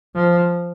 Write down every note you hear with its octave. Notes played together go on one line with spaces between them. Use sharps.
F3